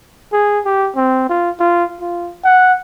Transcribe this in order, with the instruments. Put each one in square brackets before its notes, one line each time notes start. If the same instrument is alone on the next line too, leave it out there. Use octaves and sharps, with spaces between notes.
[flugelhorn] G#4
G4
C4
F4
F4
F4
F#5